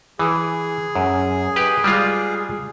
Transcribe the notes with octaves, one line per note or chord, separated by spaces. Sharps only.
E3 G#4
F#2
G4 B4
G3 G#3 F4